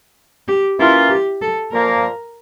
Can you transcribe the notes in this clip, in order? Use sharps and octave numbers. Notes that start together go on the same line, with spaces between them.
G4
E3 A#3 C#4 E4 F4
G4
A4
A#2 F3 A#3 A#4